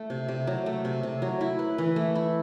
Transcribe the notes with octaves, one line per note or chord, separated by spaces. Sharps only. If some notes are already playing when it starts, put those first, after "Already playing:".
Already playing: A3
C3
C3
F#3
A3
C3
C3
F#3
E4
B4
E3
A3
E4